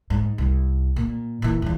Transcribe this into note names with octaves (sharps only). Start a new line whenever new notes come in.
G#2
C2
A#2
A#2 E3
E2 F3